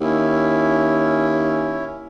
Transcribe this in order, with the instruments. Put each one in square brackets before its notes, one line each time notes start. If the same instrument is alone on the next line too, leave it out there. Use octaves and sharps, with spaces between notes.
[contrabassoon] D#2 [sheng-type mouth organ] C#4 E4